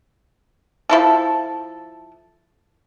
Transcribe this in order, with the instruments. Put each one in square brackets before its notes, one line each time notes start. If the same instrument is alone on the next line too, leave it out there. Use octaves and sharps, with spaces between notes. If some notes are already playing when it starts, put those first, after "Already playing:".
[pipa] F3 E4 A4